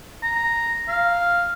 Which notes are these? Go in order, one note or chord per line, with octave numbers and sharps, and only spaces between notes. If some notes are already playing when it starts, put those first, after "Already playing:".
A#5
F5